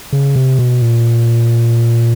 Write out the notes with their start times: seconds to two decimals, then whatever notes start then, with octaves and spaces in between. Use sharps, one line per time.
0.12 C#3
0.36 C3
0.59 B2
0.82 A#2